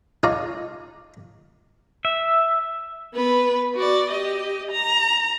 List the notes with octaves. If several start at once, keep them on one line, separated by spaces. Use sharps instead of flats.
D#4 F4 C#5 D5 F5 A#5
E5
B3 B4
F#4 D5
G4 D#5
A#5